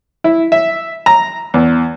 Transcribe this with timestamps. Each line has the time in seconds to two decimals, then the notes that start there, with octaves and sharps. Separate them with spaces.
0.24 E4
0.52 E5
1.06 A#5
1.54 E2